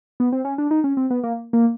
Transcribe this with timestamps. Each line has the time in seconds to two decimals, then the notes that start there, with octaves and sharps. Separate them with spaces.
0.20 B3
0.32 C4
0.45 C#4
0.58 D4
0.71 D#4
0.84 C#4
0.97 C4
1.10 B3
1.24 A#3
1.53 A#3